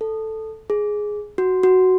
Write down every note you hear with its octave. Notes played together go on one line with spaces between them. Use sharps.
A4
G#4
F#4
F#4